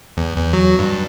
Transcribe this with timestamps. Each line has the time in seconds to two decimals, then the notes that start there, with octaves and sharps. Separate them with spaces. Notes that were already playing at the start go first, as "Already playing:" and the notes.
0.17 E2
0.36 E2
0.53 F#3
0.79 G2